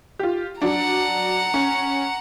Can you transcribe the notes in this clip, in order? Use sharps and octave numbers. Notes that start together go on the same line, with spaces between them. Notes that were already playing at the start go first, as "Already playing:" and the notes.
F4 G4
F#3 D4 F#5 A#5
C#4